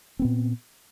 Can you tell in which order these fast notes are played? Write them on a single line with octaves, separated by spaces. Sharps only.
C4 B3 A#2